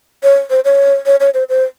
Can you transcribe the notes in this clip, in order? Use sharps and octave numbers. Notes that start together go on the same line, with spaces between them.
C#5
C5
C#5
C#5
C#5
C5
C5